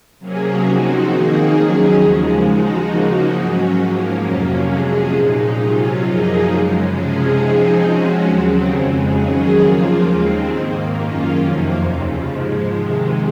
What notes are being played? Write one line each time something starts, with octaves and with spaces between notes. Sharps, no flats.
C3 F#3 A#3 C#4 G#4
F3 C4 D#4 F#4
D#3 A#3 D#4 G#4
D#3 F#3 C#4 G#4
D#2 C#3 F3 G#3
F3 G#3 D#4 F#4
C#3 F3 A#3 D#4 F#4
G#2 F#3 C#4 F#4
G#2 F3 A#3 C#4
F2 C3 F#3 A#3 C#4
C3 F3 G#3 C#4 G#4
A#2 G#3 D#4
C3 F#3 C#4 F4
F#2 F3 A#3 D#4 G#4
F#2 C#3 G#3
C3 F3 G#3 C#4 G#4
F3 C4 D#4 G#4
F3 G#3 C#4 F#4
D#2 C#3 F#3 C4
F2 C#3 G#3
D#3 F#3 C#4 G#4
C#3 F3 A#3 F4
D#2 D#3 G#3 C4
G#2 D#3 A#3
F#2 D#3 A#3 C#4 F4
F2 C3 D#3 A#3
D#2 C#3 F3
G#2 F3 G#3
C3 D#3 G#3